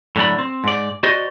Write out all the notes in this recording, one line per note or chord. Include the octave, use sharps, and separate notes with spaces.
A2 D3 F#3 D5 B5
C4
G#2 D5
F#4 C5 D5 D#5